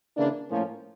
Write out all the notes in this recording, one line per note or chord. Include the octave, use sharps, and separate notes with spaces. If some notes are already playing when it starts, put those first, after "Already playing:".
C#3 E3 A#3 D4
A2 F3 A#3 C#4